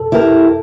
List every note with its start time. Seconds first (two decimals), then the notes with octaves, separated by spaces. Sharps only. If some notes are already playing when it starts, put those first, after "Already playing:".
Already playing: A4
0.12 E4 G4 A#4